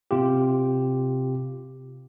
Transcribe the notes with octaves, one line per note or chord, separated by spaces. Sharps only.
C3 F4 G4